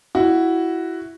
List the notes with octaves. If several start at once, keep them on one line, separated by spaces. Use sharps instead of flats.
E4 F#4